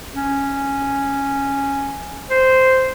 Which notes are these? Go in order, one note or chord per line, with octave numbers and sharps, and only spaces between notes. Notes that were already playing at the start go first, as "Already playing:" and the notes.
C#4
C5